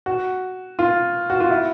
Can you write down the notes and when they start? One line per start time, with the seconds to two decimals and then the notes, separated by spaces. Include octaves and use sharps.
0.06 F#4
0.79 F4
1.30 F#4
1.40 F4
1.51 E4